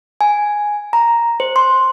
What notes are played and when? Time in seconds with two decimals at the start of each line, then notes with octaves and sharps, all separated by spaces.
0.21 G#5
0.93 A#5
1.40 C5
1.56 C6